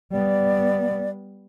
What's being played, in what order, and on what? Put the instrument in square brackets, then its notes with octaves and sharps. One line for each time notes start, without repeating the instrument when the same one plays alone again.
[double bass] G3 B3 [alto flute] D5